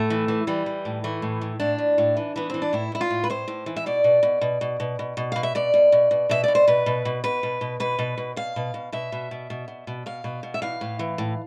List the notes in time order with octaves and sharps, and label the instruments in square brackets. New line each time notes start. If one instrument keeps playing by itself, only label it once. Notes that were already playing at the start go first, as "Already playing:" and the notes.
Already playing: [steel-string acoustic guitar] A2 A3
E3
E3
E3 G3
E3
A2
E3 A3
A2
A2
A2 D4
A2
A2
E3
E3 B3
E3 C4
D4
A2 E4
A2 E4
F4
A2
B4
A2 C5
A2
E3
E5
B2 D5
B2
B2
B2
B2
B2
B2
B2
B2 F5
E5
B2 D5
B2
B2
B2
B2 E5
B2 D5
C5
B2 B4
B2
B2
B2 B4
B2
B2
B2 B4
B2
B2
B2 F5
B2
B2
B2 E5
B2
B2
B2
B2
B2
B2 F5
B2
B2
E5
E3 F5
A2
E3
A2